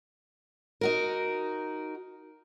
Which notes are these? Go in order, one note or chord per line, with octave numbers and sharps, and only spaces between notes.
D#4 F#4 A#4